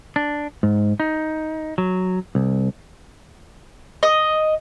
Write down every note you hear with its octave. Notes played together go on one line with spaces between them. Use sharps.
D4
G#2
D#4
F#3
C2
D#5